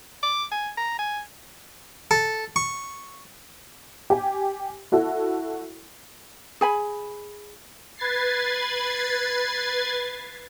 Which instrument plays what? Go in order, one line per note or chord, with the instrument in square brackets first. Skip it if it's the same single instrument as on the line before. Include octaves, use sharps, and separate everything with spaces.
[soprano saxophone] D6
G#5
A#5
G#5
[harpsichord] A4
C#6
[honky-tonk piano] G4 G#5
E4 F#4 A4
[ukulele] G#4 G#5 B5
[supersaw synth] B4 G#6 A6 C7